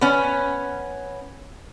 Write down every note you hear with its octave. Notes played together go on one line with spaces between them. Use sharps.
B3 C#4